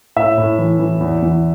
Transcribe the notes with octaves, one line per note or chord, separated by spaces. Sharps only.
A2 E5
A2
E3
E3
E2
E2